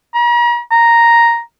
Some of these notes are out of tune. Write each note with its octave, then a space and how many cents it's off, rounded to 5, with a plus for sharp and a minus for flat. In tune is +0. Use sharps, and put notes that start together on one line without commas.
A#5 +40
A#5 +0